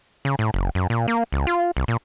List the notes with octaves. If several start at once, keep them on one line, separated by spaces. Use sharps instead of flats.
C#3
A2
F#1
F#2
A#2
A#3
C#2
F4
C2
A#2